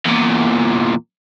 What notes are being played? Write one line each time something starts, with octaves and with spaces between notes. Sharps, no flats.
E2 A#2